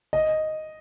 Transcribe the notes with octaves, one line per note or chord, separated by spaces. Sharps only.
D#5